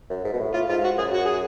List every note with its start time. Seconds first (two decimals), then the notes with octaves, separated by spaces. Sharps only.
0.10 F#2
0.24 G#2
0.33 B2
0.39 A2
0.54 A2 F4
0.69 G#2 F4
0.84 F#4
0.98 F#2 G#4
1.13 F#4
1.25 G#4